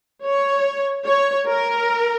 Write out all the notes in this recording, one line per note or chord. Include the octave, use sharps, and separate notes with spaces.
C#5
C#5
A#4